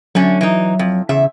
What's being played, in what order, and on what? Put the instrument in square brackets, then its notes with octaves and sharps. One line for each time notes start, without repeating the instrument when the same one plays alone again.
[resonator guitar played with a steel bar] D3 A3 C#4 [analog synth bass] F#3
[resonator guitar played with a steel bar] E3 D#4
F2
[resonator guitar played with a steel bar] E2 E5 [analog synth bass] C#3